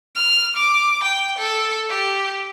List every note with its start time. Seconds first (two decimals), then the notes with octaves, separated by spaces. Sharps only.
0.16 F6
0.56 D6
1.03 G5
1.38 A4
1.90 G4